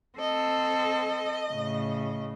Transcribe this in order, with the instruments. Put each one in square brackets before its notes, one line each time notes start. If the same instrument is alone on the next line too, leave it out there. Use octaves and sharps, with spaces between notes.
[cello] C4 A4 [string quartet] D#5
[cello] A2 C#3